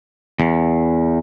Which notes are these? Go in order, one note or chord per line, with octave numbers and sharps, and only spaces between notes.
E2